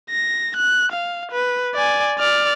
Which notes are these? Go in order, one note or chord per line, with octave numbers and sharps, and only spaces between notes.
A#6
F#6
F5
B4
D5 G#5
D5 F6